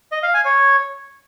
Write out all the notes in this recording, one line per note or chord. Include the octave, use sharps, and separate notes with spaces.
D#5
F5
G#5
C#5